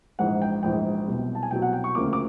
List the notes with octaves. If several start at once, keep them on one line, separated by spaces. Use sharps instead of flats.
A#1 G#2 E3 F#5
G5
A#1 G#2 E3 G5
C2 B2 F#3
A5
G#5
C2 B2 F#3 G5
F#5
G5
C#6
D2 C#3 F3 A#3 D6
D6